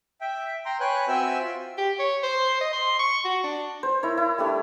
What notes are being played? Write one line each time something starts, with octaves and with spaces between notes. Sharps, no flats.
E5 G5
G5 A#5 C6
B4 C#5 G5 G#5 F#6
C4 F#4 E5 G5 G#5 E6
F4
G4
C#5
C5
D#5
C6
C#6
F#4
D4
C5
E4 A#4 C#5
E4
G3 A3 D4